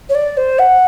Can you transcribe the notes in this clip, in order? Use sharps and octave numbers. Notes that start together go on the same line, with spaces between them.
C#5
D5
C5
F#5